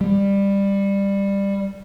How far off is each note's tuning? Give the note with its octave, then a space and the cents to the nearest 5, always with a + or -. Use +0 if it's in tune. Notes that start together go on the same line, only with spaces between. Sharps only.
G3 +15